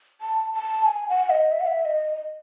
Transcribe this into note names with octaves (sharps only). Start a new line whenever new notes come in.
A5
A5
G#5
F#5
D#5
E5
F#5
E5
D#5